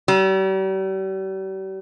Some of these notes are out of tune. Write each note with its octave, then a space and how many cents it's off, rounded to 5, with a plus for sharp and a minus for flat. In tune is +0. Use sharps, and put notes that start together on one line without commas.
G3 -40